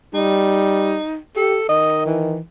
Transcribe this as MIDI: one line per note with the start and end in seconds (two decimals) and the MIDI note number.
0.14 0.97 55
0.14 1.18 63
1.36 1.59 67
1.36 1.67 69
1.69 2.37 51
1.69 2.05 75
2.06 2.40 52